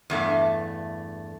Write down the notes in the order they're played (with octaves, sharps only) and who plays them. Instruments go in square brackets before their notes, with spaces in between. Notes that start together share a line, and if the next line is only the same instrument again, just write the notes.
[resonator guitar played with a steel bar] E2 G2 A3